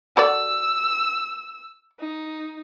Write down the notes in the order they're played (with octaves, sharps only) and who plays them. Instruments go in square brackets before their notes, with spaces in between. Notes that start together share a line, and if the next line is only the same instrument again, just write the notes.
[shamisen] F#4 A4 D5 [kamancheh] E6
[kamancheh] D#4